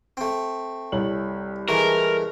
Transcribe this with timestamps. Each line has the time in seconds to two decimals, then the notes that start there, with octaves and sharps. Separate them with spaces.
0.17 A3 C4
0.92 C2 C#5 F#7
1.69 E3 G#3 A3 A#4